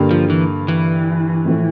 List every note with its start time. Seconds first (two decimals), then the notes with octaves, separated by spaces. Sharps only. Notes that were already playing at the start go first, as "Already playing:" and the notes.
Already playing: G2 D3 G3 A#3
0.11 F3
0.30 E3
0.68 E3
1.45 A2 F3 A3